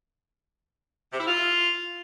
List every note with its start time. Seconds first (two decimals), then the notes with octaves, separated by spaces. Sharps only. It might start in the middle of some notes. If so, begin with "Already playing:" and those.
1.12 C3
1.19 E4
1.26 F4